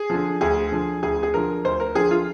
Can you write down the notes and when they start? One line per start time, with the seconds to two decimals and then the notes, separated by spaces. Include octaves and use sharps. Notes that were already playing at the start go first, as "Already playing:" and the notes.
Already playing: G#4
0.10 D3 F3
0.41 D2 G#4
0.72 D3 F3
1.03 D2 G#4
1.23 G#4
1.34 D3 F3 A#4
1.65 D2 C5
1.80 A#4
1.95 D3 F3 G#4
2.11 F4